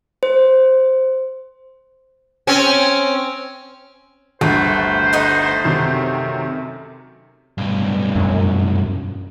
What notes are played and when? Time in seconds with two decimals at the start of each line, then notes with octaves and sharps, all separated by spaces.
0.23 C5
2.47 C4 C#4
4.41 G1 D2 A3 C5
5.13 A3 D#4 F#5
5.64 F#2 C3 D#3
7.58 B1 G2
8.16 F#2